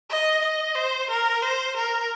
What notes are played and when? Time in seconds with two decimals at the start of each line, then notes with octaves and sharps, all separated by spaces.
0.10 D#5
0.42 D#5
0.75 C5
1.10 A#4
1.42 C5
1.76 A#4